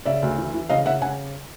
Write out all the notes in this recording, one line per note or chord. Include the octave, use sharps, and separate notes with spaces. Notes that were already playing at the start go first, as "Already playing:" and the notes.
C#3 D5 E5
D2
E3
E3
C#3 D#5 F5
C#3 E5 F#5
C#3 F#5 G#5